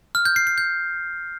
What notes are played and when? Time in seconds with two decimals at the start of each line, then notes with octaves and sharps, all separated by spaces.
0.15 F6
0.25 G6
0.36 C7
0.47 C7
0.58 G6